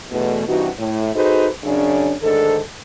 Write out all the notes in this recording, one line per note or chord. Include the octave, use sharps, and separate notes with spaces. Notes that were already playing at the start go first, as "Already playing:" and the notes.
E2 B2 A3
G2 C3 E3 D#4 F#4
A2
D#4 F#4 G#4 A4 B4 C5
F#2 C#3 C#4 D4
D2 G#2 D#3 D4 A4